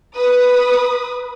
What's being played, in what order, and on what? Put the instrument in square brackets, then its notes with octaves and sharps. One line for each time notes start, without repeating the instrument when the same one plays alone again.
[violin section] B4 D#6